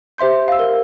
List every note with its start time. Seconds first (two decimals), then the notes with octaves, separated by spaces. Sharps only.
0.18 G4 C5 E5 C6 G6
0.48 F5 E6
0.59 A#4